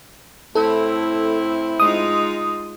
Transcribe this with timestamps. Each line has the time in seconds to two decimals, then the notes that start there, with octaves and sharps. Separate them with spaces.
0.55 A2 C4 E4 A4
1.80 G#3 D#4 F4 D#6